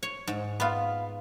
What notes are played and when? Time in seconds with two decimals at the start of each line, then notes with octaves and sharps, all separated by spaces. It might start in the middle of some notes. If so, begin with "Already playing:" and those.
0.03 C#5
0.27 G#2
0.60 B3 F4 F5 B5